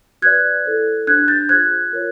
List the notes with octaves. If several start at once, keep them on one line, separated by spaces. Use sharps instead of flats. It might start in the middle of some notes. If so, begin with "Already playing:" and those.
F#4 B4 D5 F#6 G#6
E4 A4 C5
D4 G4 C5 F#6 G#6
G6 A6
F4 G#4 C5 F#6 G#6
F4 A#4 C#5